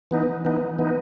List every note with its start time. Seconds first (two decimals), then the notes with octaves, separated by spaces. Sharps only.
0.11 E3 B3 D#4
0.45 E3 B3 D#4
0.79 E3 B3 D#4